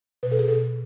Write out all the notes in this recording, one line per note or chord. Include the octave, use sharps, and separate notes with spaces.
B2 B4
A4
G#4
B2 A4